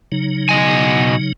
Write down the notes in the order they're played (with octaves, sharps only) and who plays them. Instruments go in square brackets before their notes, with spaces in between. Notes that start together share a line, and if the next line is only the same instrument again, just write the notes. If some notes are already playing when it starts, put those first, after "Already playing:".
[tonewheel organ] C#3 F#3 D#4
[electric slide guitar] B2 D#5 G#5